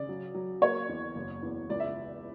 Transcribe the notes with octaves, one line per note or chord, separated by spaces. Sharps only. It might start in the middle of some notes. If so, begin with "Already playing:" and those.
Already playing: C#3 D5
F#3
F#3
A#3 C#5
E2
F#1
E2
C#2 D5
E5